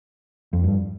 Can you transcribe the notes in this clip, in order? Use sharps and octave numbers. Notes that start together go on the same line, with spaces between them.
F2
G2